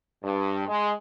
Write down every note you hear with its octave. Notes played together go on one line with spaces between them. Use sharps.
G2
G#3